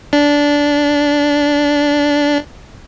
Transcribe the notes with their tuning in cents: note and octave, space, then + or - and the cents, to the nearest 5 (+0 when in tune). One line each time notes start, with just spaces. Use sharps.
D4 -15